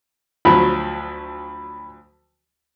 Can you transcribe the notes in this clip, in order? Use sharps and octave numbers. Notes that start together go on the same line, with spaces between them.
D2 F3 F#3 B5